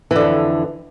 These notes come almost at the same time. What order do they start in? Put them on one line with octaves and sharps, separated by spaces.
E3 D3 F2